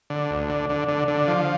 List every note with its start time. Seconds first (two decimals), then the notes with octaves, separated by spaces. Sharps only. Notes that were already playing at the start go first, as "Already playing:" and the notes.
0.10 D3
0.30 D2
0.50 D3
0.69 D3
0.88 D3
1.08 D3
1.28 F3